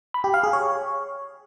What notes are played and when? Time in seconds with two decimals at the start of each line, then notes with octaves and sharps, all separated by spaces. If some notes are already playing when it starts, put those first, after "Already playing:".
0.14 B5
0.24 G4
0.34 F5
0.43 G#4
0.53 C#5